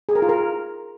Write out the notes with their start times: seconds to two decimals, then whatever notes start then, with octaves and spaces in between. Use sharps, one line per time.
0.09 G#4
0.15 A#4
0.22 F4
0.29 A#4